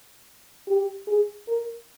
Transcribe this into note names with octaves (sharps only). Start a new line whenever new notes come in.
G4
G#4
A#4